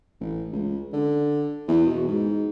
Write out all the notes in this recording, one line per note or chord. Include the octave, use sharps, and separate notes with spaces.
A1
C#2
D3
E2
B2
G#2